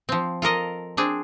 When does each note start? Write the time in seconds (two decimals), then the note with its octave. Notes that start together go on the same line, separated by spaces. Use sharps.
0.09 F3 C4
0.42 F4 A4 A#4 D#5
0.97 C4 D4 G#4